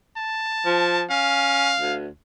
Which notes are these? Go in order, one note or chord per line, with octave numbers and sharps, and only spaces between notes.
A5
F3
C#4 F5
D2